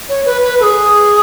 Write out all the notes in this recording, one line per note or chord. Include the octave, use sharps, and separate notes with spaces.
C#5
B4
B4
A4
G#4